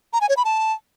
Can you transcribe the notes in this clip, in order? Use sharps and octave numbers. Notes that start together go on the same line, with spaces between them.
A#5
G#5
C#5
B5
A5